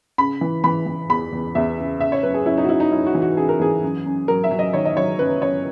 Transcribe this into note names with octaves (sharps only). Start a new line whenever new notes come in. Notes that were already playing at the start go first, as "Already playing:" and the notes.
C#3 B5
E3
E3 B5
E3
E2 B5
E2
E2 E5
C#3
C#3 E5
C#5
F#2 B4
G#4
F#2 E4
D#4
F#4
C#3 E4
D#4
F#2 E4
F#4
E3
F#4
C#3 G#4
A#4
E3 G#4
F#2
F#2
F#3 A#4
E5
F#3
D#5
D#3 C#5
D#5
F#3 C#5
F#2 B4
F#2 C#5